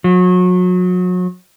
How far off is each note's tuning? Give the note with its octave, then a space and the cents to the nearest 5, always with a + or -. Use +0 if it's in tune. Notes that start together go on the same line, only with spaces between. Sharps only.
F#3 -35